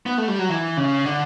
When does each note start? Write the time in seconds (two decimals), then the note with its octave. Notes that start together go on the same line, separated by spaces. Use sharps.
0.06 B3
0.18 A3
0.28 G3
0.39 F#3
0.50 E3
0.77 C#3
1.05 D3